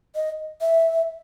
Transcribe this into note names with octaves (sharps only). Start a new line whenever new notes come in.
D#5
E5